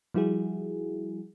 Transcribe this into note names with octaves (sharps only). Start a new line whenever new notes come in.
F3 G3 E4 F#4 G#4